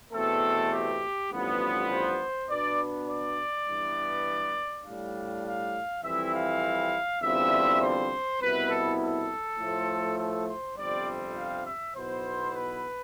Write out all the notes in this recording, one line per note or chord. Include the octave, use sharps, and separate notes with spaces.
E2 B2 A3 C4 A4
G4
A1 G2 F3 B3
C5
B2 B3 D4 D5
D5
G2 E3 B3
A2 G3 D4 F5
F5
F2 E3 G3 C4 E4 E5
F5
E2 D3 G3 C4 F4 E5
C5
C2 B2 B3 E4 B4
A4
A4
A2 F3 A3
A4
C5
G1 F2 C3 G3 C4 D5
F5
E5
B1 B2 B3 E4 C5
B4